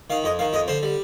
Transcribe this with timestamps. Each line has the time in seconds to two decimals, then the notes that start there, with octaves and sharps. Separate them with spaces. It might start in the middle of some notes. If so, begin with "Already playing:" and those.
0.10 D#3 F5
0.24 F2 D#5
0.39 D#3 F5
0.53 F2 D#5
0.68 D3 C5
0.83 G3